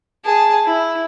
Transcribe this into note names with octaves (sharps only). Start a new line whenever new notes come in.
G#4 A5
E4